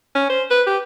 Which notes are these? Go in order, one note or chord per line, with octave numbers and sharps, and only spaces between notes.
C#4
C5
B4
G4